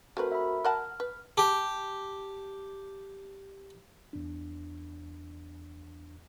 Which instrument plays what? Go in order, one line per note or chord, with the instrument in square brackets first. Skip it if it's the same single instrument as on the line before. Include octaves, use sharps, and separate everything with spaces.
[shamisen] A3 C4 B4 [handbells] F#4 A#4
[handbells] E5 B5
[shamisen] A#4 F#5 A5 [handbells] F6
[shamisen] B4
[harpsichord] G4 [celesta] A5 D6
[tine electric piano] E2 D4